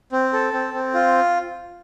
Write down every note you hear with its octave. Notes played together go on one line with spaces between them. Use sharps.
C4
A4
C4
C4
F4